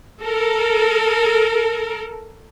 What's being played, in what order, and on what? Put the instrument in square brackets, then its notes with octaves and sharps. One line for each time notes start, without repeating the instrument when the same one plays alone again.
[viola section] A4 A#4